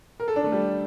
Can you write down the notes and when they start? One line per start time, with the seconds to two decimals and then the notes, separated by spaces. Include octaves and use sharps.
0.20 A#4
0.28 A4
0.36 D4
0.44 A3
0.52 G3